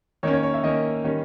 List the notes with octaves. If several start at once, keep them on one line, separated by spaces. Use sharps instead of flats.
D#3 A#3 C#4 C#5
C#5
C#5
E5
D#3 A#3 C#4 D#5
D#3 G3 C#4